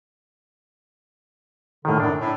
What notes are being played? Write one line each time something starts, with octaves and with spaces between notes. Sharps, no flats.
A2 D3 D#3
F#2 D4
A2